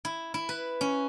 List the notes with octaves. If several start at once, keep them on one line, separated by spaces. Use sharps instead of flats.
E4
E4
B4
C#4